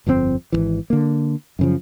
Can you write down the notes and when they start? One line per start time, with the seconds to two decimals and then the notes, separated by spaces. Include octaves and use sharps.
0.07 G1 F2 C3 C4
0.52 G#1 C#2 E3
0.90 D3 A#3
1.59 F#2 C#3 F3